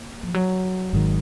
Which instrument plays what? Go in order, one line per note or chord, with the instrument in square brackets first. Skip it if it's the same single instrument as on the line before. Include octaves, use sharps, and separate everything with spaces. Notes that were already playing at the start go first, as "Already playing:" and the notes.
Already playing: [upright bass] A#3
F3
F#3
[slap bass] G#1 G#2 D#3